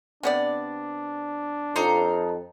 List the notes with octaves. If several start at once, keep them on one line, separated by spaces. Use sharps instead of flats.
C3 B3 D4 D5
F2 D#4 A#5 C6